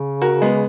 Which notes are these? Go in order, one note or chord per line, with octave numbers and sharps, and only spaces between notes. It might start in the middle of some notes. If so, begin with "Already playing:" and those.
Already playing: C#3
F#4 A#4
G#3 B3